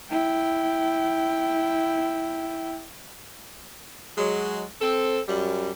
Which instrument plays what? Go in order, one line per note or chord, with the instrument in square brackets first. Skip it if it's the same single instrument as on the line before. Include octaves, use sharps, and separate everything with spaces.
[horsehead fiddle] E4 G5
[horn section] F#3 G#3
C4 A4
F#2 G3